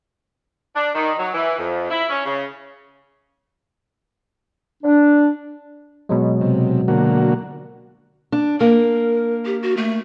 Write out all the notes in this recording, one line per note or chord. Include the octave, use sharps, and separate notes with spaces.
D4
D#3
F#3
E3
F2
E4
C#4
C#3
D4
B2 F#3 G#3
C3
D3 A#3 F#4
D4
A#3 A#4
G4
F#4
A3